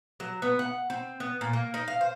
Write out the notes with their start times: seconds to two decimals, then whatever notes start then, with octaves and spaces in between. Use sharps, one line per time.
0.20 F#3
0.42 B3
0.59 F#5
0.90 C4
1.20 B3
1.41 A#2
1.53 A#3
1.74 D#4
1.88 F5
2.01 C5